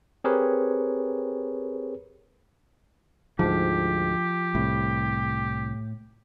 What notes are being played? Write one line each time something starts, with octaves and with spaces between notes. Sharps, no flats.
C4 G4 G#4 A#4 B4 C#5
D2 G#2 F3 G4
C2 A2